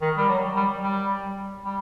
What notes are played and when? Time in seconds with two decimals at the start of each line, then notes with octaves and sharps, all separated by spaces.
0.01 D#3
0.17 G3
0.29 F#3
0.56 G3
0.83 G3
1.64 G3